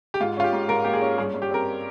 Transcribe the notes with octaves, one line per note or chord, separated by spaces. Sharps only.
G4
G#2 F4
C#4 F4
G4
G#2
G#2 A#4
A#3 G4
G#4
C#4
G2 G#4
G2
G4
C4 A#4